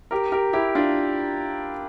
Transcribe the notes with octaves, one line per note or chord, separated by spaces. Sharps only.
G4 A#4
G4 A#4
E4 G4
D4 F4